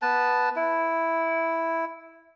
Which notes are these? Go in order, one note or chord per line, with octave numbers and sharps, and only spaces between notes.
B3 B4 A5
E4